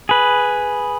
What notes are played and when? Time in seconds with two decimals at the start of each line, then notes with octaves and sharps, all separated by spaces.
0.09 G#4 B4